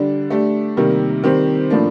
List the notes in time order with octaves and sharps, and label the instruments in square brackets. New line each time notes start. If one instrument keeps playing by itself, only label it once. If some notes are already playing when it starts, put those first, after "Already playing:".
Already playing: [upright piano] D3 G3 D4
A3 D4 G4
C3 D#3 G3 A#3
D#3 G3 C4 G4 C5
A2 F3 A#3 D4